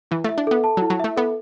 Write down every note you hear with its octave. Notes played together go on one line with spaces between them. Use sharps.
E3 E4
A3 E5
D4
B3 A4
A5
F#3
E4
F#3
A3 E5
B3 A4